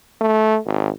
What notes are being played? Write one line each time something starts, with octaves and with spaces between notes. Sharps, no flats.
A3
G#1